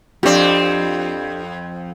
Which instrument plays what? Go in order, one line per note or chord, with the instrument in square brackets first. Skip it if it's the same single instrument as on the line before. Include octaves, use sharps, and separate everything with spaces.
[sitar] F2 C4 [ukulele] D4 G4